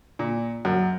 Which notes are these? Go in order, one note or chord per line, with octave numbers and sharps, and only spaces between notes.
A#2
F#2